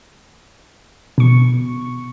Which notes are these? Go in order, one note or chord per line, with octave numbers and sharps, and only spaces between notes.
B2 C#6